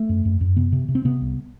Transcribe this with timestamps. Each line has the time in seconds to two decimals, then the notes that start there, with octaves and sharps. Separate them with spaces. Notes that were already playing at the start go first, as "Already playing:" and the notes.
Already playing: A3
0.09 F#2
0.25 F#2
0.41 F#2
0.57 C3 B3
0.72 C3
0.89 C3
0.95 C4
1.05 C3 B3
1.21 C2